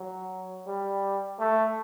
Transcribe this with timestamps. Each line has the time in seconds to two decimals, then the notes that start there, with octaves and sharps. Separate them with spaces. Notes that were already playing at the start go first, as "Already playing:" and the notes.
Already playing: F#3
0.67 G3
1.39 A3